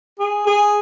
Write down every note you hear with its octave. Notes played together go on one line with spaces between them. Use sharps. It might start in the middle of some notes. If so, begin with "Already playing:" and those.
G#4
G#4